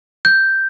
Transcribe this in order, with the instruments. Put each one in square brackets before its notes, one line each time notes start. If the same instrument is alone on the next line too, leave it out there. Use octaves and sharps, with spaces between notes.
[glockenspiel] G6